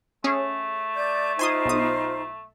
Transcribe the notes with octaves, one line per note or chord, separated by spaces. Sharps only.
A3 C#4 G#4
D5 G6
D#4 F4 C5 G#5 C6 D#6
B1 D#6